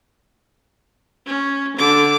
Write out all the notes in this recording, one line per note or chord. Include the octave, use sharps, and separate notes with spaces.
C#4
D3 D6